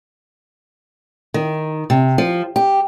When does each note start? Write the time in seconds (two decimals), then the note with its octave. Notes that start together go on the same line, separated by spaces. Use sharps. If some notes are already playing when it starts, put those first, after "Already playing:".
1.34 D#3
1.90 C3
2.18 F3
2.56 G4